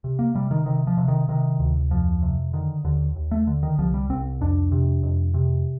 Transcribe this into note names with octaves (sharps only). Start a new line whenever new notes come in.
C3
A#3
C3 G3
D#3
C3 D#3
F3
C3
D#3
C3 D#3
D2
F2 F3
C3
D3 D#3
D#2 D3
D#2
A3
D3
D#3
C2 F3
G3
C2 C4
F2 D4
C3
F2
C3